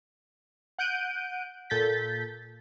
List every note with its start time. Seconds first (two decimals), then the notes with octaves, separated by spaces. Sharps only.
0.79 F#5 F#6 G6 D7 D#7
1.70 A#2 A4 G6 A6 B6